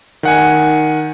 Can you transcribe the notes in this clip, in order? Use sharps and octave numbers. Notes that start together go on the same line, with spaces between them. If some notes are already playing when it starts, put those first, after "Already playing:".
D#3 F#5 G#5